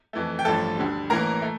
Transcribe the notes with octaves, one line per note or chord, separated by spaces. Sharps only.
F2 E3 A3
G5
A1 G2 F3 A3 A4 A5
D2 D3 G3
A1 A2 E3 A#3 A#4 A#5
A3